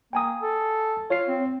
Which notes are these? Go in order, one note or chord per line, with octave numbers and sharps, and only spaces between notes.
A#3 G5 G#5 D#6
A4
F4 C#5 C7
C4